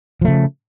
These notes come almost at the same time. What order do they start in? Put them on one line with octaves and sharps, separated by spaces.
F3 A3 C#3